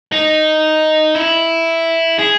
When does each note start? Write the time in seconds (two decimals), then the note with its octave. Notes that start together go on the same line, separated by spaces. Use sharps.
0.12 D#4
1.15 E4
2.19 G#4